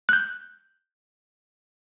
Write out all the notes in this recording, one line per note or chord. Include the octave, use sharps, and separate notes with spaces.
F#6 G6